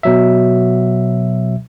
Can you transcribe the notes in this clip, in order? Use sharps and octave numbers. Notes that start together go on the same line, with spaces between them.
B2 F#3 E5